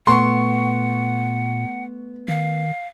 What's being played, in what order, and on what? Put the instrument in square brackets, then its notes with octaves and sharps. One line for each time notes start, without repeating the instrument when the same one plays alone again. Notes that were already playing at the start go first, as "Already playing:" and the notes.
[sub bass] A#2 [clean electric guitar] A3 B3 [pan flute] F#5 [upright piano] C6 C#6
[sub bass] D#3 [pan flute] F5